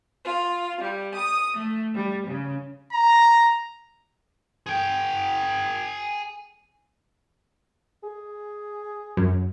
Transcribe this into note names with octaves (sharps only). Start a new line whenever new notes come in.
F4
G3
D#6
A3
G3
C#3
A#5
G#4 G5
G#4
F#2